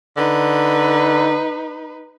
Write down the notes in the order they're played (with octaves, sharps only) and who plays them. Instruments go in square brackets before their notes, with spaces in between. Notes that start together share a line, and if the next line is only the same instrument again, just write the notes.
[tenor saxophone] D3 [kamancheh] D#4 B4